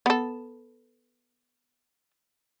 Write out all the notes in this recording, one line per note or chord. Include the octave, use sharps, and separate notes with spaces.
B3 A4